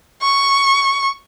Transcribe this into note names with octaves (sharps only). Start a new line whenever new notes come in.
C#6